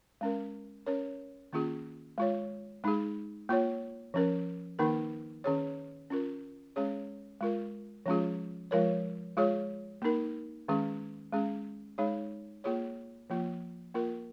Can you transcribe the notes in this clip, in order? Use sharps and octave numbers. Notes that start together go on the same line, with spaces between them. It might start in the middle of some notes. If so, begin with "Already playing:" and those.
G#3 C#4 A#4
C#4 A#4 C#5
D#3 A#3 C#4 F4 G#4
G#3 F4 C#5
G#3 D#4 G#4
A#3 F4 C#5
F3 C#4 A#4
D#3 A#3 D#4 A#4
D#3 C#4 G#4 C#5
C#4 F4 A#4
G#3 C#4 G#4 C#5
G#3 F4 A#4
F3 G#3 C#4 F4 G#4
F3 G#3 F4 A#4 C#5
G#3 F4 G#4 C#5
A#3 D#4 A#4
D#3 G#3 C#4 G#4
G#3 C#4 G#4
G#3 D#4 G#4 C#5
A#3 F4 G#4 C#5
F3 A#3 F4
A#3 F4 A#4